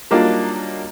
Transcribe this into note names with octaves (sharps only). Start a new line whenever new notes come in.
F#3 G3 A#3 D4 D#4 F4